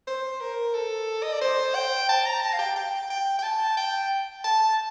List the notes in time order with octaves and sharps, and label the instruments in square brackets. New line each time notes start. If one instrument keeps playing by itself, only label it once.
[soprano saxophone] C5
A#4
A4
D#5
D5
C5
G5
A5
A#5
A5
F5
G5
G5
G5
G5
A5
G5
A5